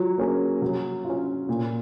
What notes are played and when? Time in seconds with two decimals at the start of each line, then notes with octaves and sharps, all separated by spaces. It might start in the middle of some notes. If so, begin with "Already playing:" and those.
Already playing: F#3 F4
0.18 A#3 C#4 G#4
0.62 F#3
1.04 F4
1.10 C#4
1.49 A#2